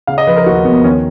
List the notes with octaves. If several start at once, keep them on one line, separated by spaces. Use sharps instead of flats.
C#3 F5
D#5
F3 B4
A#4
D#2 F#4
D#2 B3
D#3 C#4